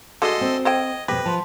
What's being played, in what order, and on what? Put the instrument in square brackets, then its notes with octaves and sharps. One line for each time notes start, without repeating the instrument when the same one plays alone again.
[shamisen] D3 G#3 A3 [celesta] F#4 [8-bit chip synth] A4 D#5 C6
[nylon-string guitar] C4
[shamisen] A4 C5 G5 [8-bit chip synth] D#5 [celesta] G#6
[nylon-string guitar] F2 B2 [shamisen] G4 [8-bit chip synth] B4 [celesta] G5 A#6
[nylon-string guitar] F3 [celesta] A5 C6